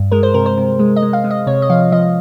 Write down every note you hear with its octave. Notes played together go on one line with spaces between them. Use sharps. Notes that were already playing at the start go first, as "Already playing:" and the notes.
Already playing: G2
G#3 A#4
C5
C3 A#4
C5
C3
G#3
D#5
G#3
F5
G#3
D#5
C3 C#5
D#5
F3 F5
F3 D#5